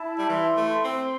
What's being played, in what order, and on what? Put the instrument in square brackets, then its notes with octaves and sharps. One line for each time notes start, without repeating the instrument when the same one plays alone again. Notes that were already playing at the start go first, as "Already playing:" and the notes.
Already playing: [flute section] E4 A5
[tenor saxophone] G3
[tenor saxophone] E3 [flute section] C6
[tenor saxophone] A3
[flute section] C6
[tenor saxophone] C4